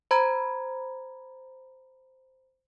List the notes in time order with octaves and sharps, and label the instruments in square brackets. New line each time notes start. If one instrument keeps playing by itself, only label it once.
[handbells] C5 A#5 B5 G#6